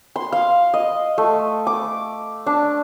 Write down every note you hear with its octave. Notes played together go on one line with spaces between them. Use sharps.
C6
F5
D#5
A3
D6
D4